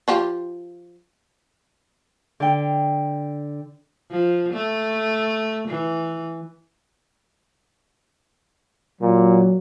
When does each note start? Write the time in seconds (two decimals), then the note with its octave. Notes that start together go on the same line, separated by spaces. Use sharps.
0.08 F3 F4 G4
2.40 D3 G5
4.10 F3
4.53 A3
5.68 E3
9.01 A#2 F#3